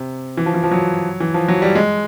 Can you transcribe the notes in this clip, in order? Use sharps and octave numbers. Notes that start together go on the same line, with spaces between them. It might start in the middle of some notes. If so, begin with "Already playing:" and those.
Already playing: C3
E3
F3
E3
F3
F#3
E3
F3
F#3
G3
G#3